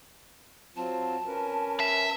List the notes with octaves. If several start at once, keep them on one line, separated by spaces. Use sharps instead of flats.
F#3 C4 F4 A5
C#4 A#4 B4
E5